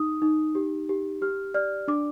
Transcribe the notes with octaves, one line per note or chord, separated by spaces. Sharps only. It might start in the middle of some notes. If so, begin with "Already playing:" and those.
Already playing: D#4 D#6
D#4
G4
G4
G4 F6
D5 F6
D4 D6